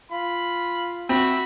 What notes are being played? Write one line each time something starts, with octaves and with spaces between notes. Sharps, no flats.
F4 B5
C4 F#4 E5 B5